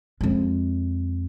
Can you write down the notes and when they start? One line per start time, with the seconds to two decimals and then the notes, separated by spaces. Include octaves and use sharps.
0.21 F2 G#3